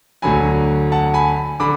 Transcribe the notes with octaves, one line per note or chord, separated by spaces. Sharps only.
D2 D3 F#3 G#5 B5
F#5 A5
G#5 B5
D3 B5 D6